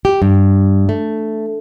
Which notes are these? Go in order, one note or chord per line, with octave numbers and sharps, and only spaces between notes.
G4
G2
A3